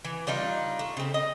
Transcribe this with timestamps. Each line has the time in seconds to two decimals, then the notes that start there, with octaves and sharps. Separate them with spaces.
0.05 E3
0.27 G3 D4 D#4 F4
0.79 A3
0.97 C#3 C4
1.14 D#5